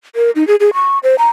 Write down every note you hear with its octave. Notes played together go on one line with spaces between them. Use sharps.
A#4
D#4
G#4
G#4
C#6
C5
A#5